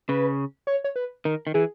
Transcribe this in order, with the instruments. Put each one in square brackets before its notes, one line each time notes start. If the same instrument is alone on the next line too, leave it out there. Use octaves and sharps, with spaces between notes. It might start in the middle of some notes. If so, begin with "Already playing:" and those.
[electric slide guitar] C#3 [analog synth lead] B4
[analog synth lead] C#5
C#5
B4
[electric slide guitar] D#3 [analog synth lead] A#4
[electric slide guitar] D#3
[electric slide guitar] E3 [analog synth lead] G#4